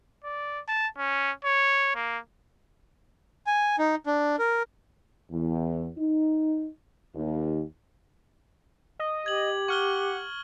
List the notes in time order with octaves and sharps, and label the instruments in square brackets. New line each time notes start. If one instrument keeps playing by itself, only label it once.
[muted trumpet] D5
A5
C#4
C#5
A#3
[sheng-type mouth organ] G#5
D#4
D4
A#4
[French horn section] E2
D#4
D#2
[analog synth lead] D#5
[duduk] G4 [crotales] G#6 F#7
[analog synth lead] F#5 [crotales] C#6 F6 G7